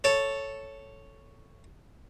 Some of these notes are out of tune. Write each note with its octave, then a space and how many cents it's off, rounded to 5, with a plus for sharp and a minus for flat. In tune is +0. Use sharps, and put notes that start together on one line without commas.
A4 +0 C#5 +0